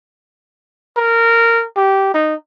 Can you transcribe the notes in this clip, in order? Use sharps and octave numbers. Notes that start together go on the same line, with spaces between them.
A#4
G4
D#4